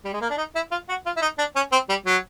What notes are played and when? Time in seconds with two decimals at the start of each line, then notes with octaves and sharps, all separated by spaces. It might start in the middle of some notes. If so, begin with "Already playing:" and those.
0.04 G3
0.13 G#3
0.21 A#3
0.30 D4
0.37 D#4
0.55 E4
0.71 F4
0.88 F#4
1.06 F4
1.16 E4
1.21 D#4
1.38 D4
1.55 C#4
1.72 C4
1.89 G3
2.06 F#3